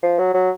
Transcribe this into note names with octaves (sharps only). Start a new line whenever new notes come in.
F3
F#3
F#3